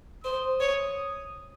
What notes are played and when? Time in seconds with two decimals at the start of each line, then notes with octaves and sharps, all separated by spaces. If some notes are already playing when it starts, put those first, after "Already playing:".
0.24 C5 D#6
0.60 C#5